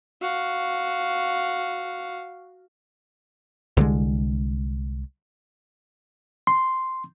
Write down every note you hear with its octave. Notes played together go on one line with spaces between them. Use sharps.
F#4 F5
C2 D3 F3 G#3
C6